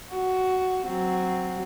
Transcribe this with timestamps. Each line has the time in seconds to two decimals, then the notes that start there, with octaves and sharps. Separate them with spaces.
0.11 F#4
0.86 F#3 C4